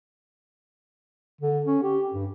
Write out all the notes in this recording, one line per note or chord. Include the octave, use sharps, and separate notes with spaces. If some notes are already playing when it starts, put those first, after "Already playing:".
D3
C#4
G4
G2